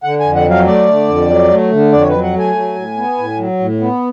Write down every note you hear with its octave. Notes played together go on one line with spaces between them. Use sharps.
D3 F#5
F2 G#5
F#5
F#3 F5
A3 D5
D3
F2
F#3
A3
D3
F2 D5
C#5
F#3 B4
F#5
A3 G#5
F#3
A2
B3
A2
F#3
A2
B3